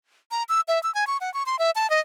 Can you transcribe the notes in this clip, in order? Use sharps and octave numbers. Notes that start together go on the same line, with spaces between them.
A#5
E6
E5
E6
G#5
C#6
F#5
C#6
C6
E5
A5
D#5